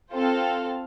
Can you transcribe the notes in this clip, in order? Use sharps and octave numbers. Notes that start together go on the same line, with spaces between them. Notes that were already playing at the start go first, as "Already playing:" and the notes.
C4 F4 A4 C5 F5